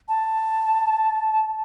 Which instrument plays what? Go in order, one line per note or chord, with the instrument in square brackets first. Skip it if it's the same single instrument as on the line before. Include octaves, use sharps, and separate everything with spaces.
[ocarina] A5